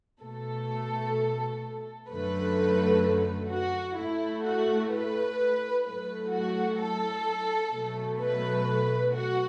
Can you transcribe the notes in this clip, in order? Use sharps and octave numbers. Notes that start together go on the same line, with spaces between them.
B2 A3 A4
F#2 D3 F#3 A3 B4
F#4
A2 A3 E4
F#4
B4
A2 F#3 A3 B4
F#4
A4
B2 F#3 A3
B4
F#4